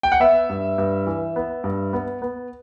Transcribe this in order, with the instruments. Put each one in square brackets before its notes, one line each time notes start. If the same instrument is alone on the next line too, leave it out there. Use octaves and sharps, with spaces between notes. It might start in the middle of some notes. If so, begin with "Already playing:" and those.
[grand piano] G5
F#5
B3 E5
G2
G2
E3
B3
G2
B3
B3